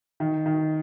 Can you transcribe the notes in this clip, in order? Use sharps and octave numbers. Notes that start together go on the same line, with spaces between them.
D#3
D#3